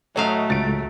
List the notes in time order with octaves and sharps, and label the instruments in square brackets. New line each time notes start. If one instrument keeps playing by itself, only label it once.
[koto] A2 F#3 F5 [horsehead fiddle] A3 [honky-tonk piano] C#5 D#5
[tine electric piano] C#2 [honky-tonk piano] A6 D7